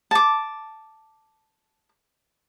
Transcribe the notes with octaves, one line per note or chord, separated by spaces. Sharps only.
A5 D6